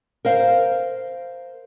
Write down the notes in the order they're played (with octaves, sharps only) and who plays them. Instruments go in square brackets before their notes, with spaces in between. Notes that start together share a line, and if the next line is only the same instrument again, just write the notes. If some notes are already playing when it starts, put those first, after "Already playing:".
[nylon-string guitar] A#4 C5 F5